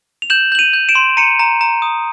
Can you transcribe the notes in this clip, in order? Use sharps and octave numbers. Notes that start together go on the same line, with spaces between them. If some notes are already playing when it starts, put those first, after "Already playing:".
F7
G6 E7 F#7
G6 F#7
D#7 F7
G6
D7 E7
C6
A#5 C#7 D#7
A#5
A#5
D#6